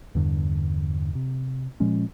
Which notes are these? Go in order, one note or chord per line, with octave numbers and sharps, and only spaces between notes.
E2 G2 D3
C3
A#2 F3 G#3 C#4